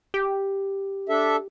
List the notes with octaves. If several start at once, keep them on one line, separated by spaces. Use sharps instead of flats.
G4
D4 A4 E5